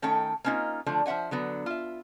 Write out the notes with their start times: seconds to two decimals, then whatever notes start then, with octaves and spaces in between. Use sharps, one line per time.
0.02 D#3 A3 C#4 A4 G5
0.44 A#3 C4 C#4 D#4 F4
0.86 D3 F3 A3 D4
1.06 F3 C5 E5 F#5 G#5
1.31 D3 F#3 B3
1.66 F4 E5